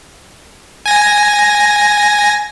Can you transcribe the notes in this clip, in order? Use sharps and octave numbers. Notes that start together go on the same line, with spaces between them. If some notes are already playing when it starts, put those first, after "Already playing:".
G#5 A#6